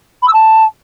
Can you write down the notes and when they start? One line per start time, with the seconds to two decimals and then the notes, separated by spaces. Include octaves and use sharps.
0.22 B5
0.27 E6
0.33 A5